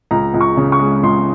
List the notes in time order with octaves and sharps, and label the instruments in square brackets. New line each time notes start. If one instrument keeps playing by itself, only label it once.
[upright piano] C#2 A#5
C#2
C#6
C#3
C#6
G#3
C#2 C6